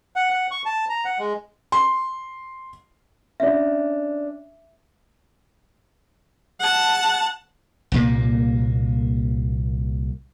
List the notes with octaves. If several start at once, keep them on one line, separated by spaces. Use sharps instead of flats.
F#5
F#5
C#6
A5
A#5
F#5
G#3
C6
C#4 D4 E5
F#5 A5
C2 A#2 A#3